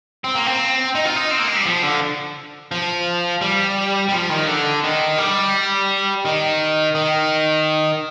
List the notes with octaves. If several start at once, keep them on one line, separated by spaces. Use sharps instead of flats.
C4
A#3
C4
D#4
F4
D#4
C4
A#3
G#3
G3
F3
D3
F3
G3
G3
F3
D#3
D3
D#3
G3
D#3
D#3